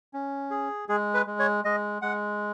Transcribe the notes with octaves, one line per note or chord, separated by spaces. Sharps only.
C#4
G#4
G#3 G#4
B4
G#3
C#5
G#3 D#5
G#3 F#5